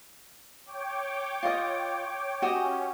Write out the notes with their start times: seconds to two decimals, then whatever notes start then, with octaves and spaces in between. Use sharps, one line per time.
0.66 C#5 G5 D6
1.43 F4 D#5
2.42 C#4 F#4 G4 D#5